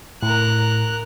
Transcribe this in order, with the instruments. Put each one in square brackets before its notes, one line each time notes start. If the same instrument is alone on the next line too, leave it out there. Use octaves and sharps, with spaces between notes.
[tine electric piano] A2 [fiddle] A#4 F#6